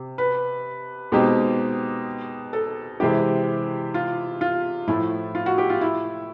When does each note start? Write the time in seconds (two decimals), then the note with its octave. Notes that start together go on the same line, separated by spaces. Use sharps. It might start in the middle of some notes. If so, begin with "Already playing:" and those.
Already playing: C3
0.18 B4
1.12 B2 G#3 C4 D#4 G4
2.53 A4
3.00 C3 E3 G#3 C4 E4 G4
3.94 F4
4.41 F4
4.87 A2 F3 A3 E4
5.35 F4
5.46 F#4
5.58 G4
5.70 F4
5.81 E4